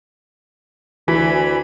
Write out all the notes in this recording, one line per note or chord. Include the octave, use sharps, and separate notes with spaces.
D2 E3 F4 F#4 G#5 B5